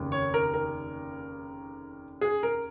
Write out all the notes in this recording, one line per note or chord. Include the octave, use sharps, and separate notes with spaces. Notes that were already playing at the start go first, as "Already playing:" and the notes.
Already playing: F1 D#2 C#3
C#5
A#4
A#4
G#4
A#4